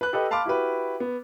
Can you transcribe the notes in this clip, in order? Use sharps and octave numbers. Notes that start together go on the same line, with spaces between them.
B4 F#6
G4 A4 B4 D#5
F5 A5 B5 C6 D6 F6
E4 F#4 G4 B4
B3